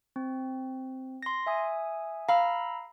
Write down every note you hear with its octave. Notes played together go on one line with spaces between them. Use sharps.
C4
C6 A#6
E5 G#5 D#6
F5 A#5 B5 E6